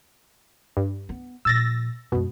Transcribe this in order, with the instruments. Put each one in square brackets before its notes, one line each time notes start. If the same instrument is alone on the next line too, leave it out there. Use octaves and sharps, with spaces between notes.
[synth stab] G2
[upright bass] B3
[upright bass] A#2 F3 [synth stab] E6 A6 A#6
[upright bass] F#2 G#3 [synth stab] B2